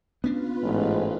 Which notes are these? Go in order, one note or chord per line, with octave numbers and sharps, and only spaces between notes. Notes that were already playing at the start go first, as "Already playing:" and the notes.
B3 C#4 D4 F4 B4
A1 G#2